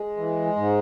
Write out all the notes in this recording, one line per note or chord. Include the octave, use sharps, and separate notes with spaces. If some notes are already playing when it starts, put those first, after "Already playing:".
Already playing: G#3
E3
G#2